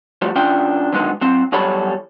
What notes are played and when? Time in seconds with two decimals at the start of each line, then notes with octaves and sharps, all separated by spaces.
0.22 F3 G3 A3 F#4
0.35 E3 C#4 D4 F4 G5
0.93 D3 D#3 F#3 G#3 B3 D#4
1.21 F#3 C4
1.52 E2 F#3 G3 A4 C#5 B5